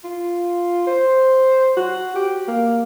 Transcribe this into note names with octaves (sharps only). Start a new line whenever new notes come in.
F4
C5
F#4
G4
A#3